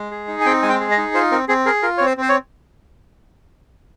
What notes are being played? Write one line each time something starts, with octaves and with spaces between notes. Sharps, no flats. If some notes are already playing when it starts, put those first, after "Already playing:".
Already playing: G#3
G#4
D#4
G#5
C4 G5
G#3 G#5
G5
G#4
D#5
D#4
F4 C5
C4 A#4
C4 G#4
G#4 A#4
F4 A#4
C4 C#5
C5
C4 C5
C#5